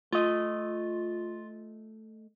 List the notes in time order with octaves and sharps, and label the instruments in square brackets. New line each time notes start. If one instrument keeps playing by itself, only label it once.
[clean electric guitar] A3 D#5 [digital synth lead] F4